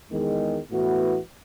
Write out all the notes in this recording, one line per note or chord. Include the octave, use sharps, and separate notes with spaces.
E2 D#3 G#3
A2 E3 B3 F#4